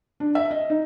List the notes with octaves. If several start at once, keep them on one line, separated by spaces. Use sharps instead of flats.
D4
E5
D#5
D#4